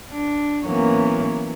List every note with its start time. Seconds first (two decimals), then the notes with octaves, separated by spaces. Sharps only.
0.12 D4
0.64 E3 F#3 A#3 B3 C#4